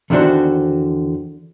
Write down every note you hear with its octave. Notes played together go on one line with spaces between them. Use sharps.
E2 D3 D#3 D4 F#4 C5